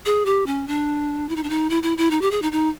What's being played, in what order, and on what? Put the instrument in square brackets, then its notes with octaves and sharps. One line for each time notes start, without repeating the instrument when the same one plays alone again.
[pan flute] G#4
G4
C#4
D4
E4
D#4
D4
D#4
E4
E4
E4
D#4
G4
G#4
D#4
D#4